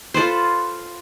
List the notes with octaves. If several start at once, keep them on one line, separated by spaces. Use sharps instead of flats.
F4 A4 B4 C5